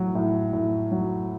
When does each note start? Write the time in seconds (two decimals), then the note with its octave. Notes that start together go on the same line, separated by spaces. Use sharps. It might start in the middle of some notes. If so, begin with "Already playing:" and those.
Already playing: A2 F#3
0.15 A2
0.53 A2
0.91 F#3